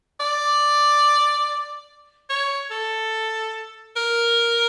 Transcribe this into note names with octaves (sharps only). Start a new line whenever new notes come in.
D5
C#5
A4
A#4